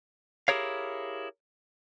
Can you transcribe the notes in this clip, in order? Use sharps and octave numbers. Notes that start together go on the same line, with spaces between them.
E4 G4 G#4 A#4 C#5 F5